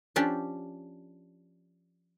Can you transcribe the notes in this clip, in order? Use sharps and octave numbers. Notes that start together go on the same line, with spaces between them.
F3 C#4 D4 G4